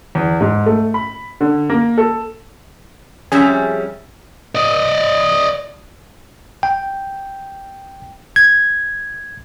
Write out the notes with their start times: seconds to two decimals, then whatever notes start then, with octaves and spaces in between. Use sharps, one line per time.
0.15 E2
0.41 G#2
0.66 A3
0.94 B5
1.41 D3
1.70 A#3
1.98 A4
3.32 F2 G3 C#4 G#4 E5
4.55 D5 D#5
6.63 G5
8.36 G#6